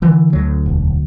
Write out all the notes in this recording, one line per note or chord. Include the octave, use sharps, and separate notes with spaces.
D3 E3
D2 F#3
E1